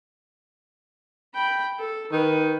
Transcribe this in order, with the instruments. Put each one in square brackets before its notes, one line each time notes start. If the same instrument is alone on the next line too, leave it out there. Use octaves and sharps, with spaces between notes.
[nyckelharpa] G5 B5
A4
[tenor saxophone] D#3 [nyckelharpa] B4